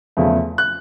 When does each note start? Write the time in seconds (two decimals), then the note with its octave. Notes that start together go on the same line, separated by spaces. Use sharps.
0.17 E2 C#3 F3 A3
0.58 F#6